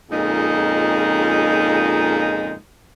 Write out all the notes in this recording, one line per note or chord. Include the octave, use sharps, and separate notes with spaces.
F2 A#2 C#3 G#3 D#4